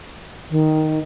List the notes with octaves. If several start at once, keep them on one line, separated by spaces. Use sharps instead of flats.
D#3